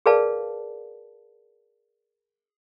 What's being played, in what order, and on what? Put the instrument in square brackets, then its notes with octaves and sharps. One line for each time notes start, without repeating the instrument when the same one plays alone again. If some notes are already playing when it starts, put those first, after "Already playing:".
[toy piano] G#4 A#4 B4 D5 F5 A5